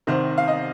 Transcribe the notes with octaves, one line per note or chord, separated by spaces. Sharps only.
C2 C3 D#3 C5
F5
D#5